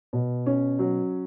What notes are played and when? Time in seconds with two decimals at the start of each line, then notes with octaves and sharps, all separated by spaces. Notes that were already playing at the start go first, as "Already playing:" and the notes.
0.13 B2
0.46 C#4
0.79 F#3